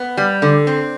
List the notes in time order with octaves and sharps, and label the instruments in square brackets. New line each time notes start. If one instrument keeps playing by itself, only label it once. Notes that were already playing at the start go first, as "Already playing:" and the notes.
Already playing: [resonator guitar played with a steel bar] B3
G3
D3
C4